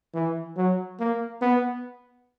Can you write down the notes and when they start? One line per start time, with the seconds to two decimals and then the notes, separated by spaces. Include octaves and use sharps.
0.14 E3
0.57 F#3
1.00 A#3
1.42 B3